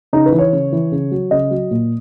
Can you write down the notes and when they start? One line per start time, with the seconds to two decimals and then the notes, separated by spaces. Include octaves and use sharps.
0.13 C#3 D#4
0.26 B4
0.32 E3
0.39 C#5
0.53 C#3
0.72 E3
0.92 C#3
1.11 F#3
1.31 C#3 D#5
1.51 F#3
1.71 A#2